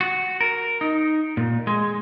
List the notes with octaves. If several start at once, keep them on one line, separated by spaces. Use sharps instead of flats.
F#4
A#4
D#4
A#2
G#3